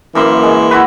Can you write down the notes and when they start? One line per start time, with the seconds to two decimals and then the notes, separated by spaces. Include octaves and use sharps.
0.15 F#2 E3 A#3 C6
0.43 G#3
0.71 E4 F#4 B4